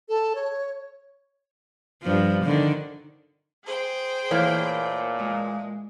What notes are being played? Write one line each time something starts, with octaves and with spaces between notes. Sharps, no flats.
A4
C#5
G2 F3
D3 D#3
G#4 C5 G5
A#2 E3 A3 A#3 C#5
G#3